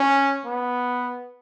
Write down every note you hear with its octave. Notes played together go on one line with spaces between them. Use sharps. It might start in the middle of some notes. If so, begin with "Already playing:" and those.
Already playing: C#4
B3